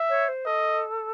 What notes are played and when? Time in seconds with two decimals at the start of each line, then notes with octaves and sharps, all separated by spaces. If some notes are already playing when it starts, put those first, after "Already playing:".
Already playing: E5
0.09 C#5
0.28 C5
0.46 A4 D#5